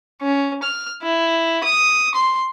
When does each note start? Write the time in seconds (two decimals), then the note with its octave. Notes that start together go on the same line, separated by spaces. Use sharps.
0.22 C#4
0.63 F6
1.02 E4
1.63 D#6
2.15 C6